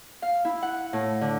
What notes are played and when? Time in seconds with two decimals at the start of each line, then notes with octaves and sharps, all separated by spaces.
0.22 F5
0.45 E4
0.62 F#5
0.93 A2
1.21 D3